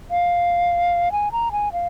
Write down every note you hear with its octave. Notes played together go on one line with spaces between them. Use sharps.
F5
G#5
A#5
G#5
F5